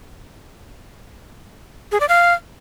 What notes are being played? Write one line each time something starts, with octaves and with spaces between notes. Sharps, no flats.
G#4
D5
F5